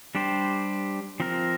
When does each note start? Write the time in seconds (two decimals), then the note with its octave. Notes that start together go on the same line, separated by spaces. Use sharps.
0.15 G3 D4 G4 C5
1.20 F3 C4 A#4